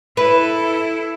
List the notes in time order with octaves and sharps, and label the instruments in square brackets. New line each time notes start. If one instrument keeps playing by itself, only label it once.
[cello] E4 A4 [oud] B4